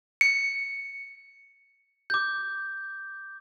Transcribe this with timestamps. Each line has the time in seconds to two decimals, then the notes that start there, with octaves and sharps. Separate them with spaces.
0.21 C#7
2.10 D6 G6